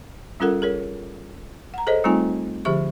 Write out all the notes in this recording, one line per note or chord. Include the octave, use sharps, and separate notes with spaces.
G3 C#4 F4 A4 A#4 F#5
G#4 A#4 C#5
F#5 A#5
G#4 A4 C5 C#5 D#5
G3 A3 C4 D#4 F4 G#5
D3 F3 G4 G#4 E5 C#6